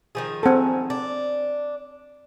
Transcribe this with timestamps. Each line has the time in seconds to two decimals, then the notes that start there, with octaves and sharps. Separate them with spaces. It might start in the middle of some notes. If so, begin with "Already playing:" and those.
0.15 D#3 F3 G#4
0.43 C4 A4
0.90 D4